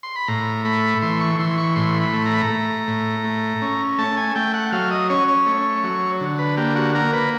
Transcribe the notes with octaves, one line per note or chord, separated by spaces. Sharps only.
C6
B5
A2 A#5
A3 B5
E3 C6
C#6
E3 C6
C#6
A2 C6
B5
A3
A#5
B5
A#5
A3
A2
A3
C#4
A3 A5
G#5
A3 G5
F#5
F#3 F5
D#5
C#4 C#5
C#5
A3
F#3
D3
B4
A#3 G4
F#4
A#3 A#4
B4